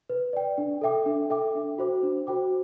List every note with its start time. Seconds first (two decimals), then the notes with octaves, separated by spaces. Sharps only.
0.10 B4
0.33 D5 G5
0.58 D4
0.81 A4 E5 G5 D6
1.06 D4
1.30 A4 E5 G5 D6
1.55 D4
1.78 F#4 C5 G5 D6
2.03 D4
2.27 F#4 C5 G5 D6